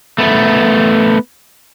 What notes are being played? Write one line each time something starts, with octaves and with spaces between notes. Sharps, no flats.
A3 B3